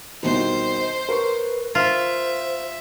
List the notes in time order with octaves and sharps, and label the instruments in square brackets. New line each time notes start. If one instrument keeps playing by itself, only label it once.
[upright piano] C2 B2 D#3 [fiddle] C5 [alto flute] D#5
[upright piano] A#4 C#6 [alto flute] B4
[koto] F4 [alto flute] C5 [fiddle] E5